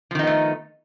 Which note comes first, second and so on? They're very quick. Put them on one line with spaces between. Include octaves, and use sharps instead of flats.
F3 D#3 D#4 B3 A3